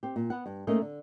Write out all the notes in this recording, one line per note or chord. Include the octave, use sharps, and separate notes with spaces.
C4 G4
A#2
B3 F#5
G2
A3 A#3 C#4 D#4 A#4 D#5
D3